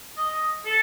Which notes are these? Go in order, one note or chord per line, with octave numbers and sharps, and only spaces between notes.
D#5
A4